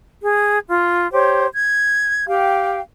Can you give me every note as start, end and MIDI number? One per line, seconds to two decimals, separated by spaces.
0.22 0.58 68
0.68 1.09 65
1.11 1.46 67
1.11 1.46 72
1.11 1.46 73
1.51 2.27 92
2.27 2.79 67
2.27 2.79 77
2.27 2.79 79